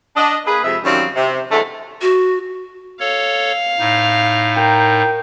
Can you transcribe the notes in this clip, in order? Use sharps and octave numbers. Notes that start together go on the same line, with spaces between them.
D4 D#5
A#3 G#4 B4
F2 C3 G#3 E5
F#2 D#3 F3 G3 C4 C#4
C3
E2 D3 F#3 G#3 A3
F#4
A4 C#5 F5
A2 D#4
A#4 G5